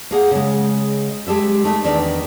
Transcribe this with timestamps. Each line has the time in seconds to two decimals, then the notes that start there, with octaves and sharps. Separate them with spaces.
0.11 A#3 G#4 F#5
0.31 C#3 G#3
1.27 G#3 G4 A4 E5
1.64 A3 D#4 E5
1.84 E2 D#3 D4 D5 E5